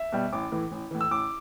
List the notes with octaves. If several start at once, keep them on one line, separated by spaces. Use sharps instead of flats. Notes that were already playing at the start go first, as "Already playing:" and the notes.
Already playing: E5
B2 G3
A1 D6
A2 E3
A1
A2 E3
E6
A1 D6